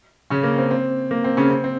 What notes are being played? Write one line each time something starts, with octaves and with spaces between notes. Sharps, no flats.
C#3 C#4
A#3
C4
C4
A#3
C4
C#3 C#4
C4
C4